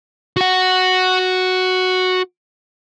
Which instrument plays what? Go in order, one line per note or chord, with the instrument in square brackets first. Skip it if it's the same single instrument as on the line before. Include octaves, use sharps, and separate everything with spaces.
[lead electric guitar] F#4 F#5